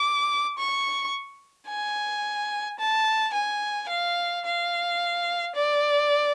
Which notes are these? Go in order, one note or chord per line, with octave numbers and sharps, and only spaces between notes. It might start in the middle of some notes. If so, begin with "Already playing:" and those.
Already playing: D6
C#6
G#5
A5
G#5
F5
F5
D5